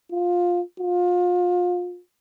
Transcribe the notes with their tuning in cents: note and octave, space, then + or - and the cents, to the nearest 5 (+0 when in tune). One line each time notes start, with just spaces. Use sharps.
F4 +15
F4 +30